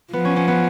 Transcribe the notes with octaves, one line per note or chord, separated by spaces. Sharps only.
F3 B3
C#4
C#4
B3